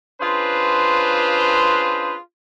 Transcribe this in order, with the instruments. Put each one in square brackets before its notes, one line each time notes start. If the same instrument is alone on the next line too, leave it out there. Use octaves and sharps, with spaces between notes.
[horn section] C#4 D4 F4 G#4 B4 C5